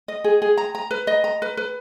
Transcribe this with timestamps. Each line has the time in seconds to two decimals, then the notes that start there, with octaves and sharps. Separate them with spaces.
0.08 D#5
0.24 G#4
0.42 G#4
0.58 A#5
0.75 A#5
0.91 B4
1.07 D#5
1.24 A#5
1.42 B4
1.57 B4